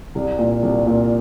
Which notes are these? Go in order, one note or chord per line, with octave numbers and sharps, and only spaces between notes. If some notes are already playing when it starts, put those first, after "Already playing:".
C2
A#2
C2
A#2